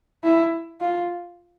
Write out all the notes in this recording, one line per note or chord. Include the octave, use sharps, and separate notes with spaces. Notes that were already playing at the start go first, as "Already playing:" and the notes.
E4
F4